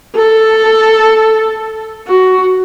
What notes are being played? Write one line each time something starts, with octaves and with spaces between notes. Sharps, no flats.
A4
F#4